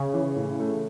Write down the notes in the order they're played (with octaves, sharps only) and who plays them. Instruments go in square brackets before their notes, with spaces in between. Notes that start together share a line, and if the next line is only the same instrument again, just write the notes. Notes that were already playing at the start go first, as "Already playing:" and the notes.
Already playing: [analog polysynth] C#3
[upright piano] E3
A2
A3